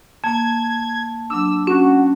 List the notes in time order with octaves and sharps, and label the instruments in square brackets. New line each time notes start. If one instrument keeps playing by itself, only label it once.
[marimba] A#3 [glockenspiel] A5 [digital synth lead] G#6
[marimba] F#3 D4 [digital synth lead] E6
[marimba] C#4 [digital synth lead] F#4